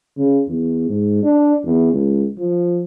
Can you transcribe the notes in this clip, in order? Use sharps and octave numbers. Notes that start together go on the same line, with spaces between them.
C#3
E2
G#2
D4
E2
C#2
F3